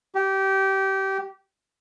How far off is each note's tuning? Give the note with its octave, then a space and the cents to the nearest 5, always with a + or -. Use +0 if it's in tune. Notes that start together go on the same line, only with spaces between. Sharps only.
G4 -20